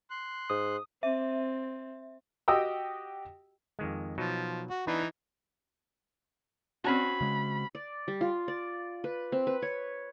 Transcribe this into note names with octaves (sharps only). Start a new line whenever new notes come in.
C6 F#6
G#2 D#6
C4 E5
F#4 G4 D#5 G5 D#6 E6
F2 D#3 G#3
B2 F3 F#3 D#4
F#4
E3 B3 D4 D#4 B4
C4 C#4 F#4 B5
C#3 G#3
D5
G3
F4
D5
B4
C4
B4
C#5